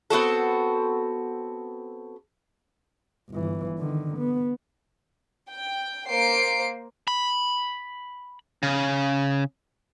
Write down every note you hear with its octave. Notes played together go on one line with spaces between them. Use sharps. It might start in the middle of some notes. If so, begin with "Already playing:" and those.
B3 C4 F#4 A4
G1 E3
D3 D#3
B3
G5
A#3 C5 C7 D7
B5
C#3